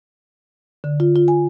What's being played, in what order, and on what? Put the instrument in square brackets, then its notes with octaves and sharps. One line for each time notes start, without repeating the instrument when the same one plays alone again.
[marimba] D3
F4
F4
G#5